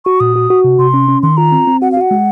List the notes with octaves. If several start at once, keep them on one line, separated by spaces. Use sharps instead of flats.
F#4 C#6
A#2 D#6
F#4
F#4
C3
C3 C6
C#4
C#4
D#3 C6
F4 A#5
C4
C4
F#4 F#5
F5
F#4 F#5
G#3